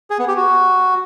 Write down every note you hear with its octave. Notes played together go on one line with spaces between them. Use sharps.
G#4
B3
G4
F#4